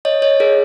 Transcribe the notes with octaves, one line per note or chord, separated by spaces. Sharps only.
C#5 D#5
C#5 D#5
G#4 A#4